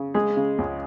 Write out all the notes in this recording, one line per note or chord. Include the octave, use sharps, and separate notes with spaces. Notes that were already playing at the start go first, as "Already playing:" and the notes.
Already playing: C#3
G#3 G#4
C#3
C#2